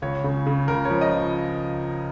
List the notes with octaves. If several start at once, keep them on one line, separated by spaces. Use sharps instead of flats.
C#2 C#5
C#3
C#3
C#2 A#4
C#5
F3
D#5